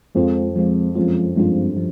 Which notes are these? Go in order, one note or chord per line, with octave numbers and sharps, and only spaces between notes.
F2 F3 G#3 C4 F4
F3 G#3 C4 F4
F#2 F3 G#3 C4 F4
G2 F3 G#3 C4 F4
F3